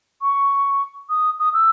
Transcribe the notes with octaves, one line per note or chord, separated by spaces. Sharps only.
C#6
D#6
D#6
E6